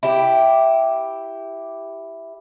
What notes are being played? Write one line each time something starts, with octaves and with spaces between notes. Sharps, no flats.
E4 G4